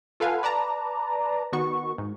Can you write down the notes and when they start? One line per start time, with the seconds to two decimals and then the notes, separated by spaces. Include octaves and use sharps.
0.20 F4 A4 B4 F5 F#5 G#5
0.43 B4 D5 A5 A#5
1.52 D#3 B3 F#4 C#6
1.98 G#2